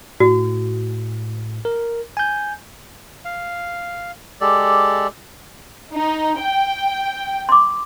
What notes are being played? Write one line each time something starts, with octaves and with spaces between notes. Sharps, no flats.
A2 F#4
A#4
G#5 G6
F5
G#3 G4 A4 D5
D#4
G5
C6 D6